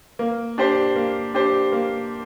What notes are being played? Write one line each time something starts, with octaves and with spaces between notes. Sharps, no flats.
A#3
D4 G4 C5
A#3
D4 G4 C5
A#3